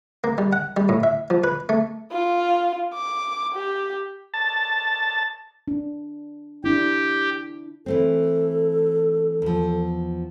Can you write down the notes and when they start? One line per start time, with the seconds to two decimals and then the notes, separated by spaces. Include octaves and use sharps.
0.24 A#3
0.38 G3
0.53 F#5
0.77 G3
0.89 A2
1.03 E5
1.30 F3
1.44 B4
1.69 A3
2.12 F4
2.94 D6
3.55 G4
4.34 A5
5.68 D4
6.64 D4 E4 G4
7.86 E3 A3 C4 A4
9.42 E2 F3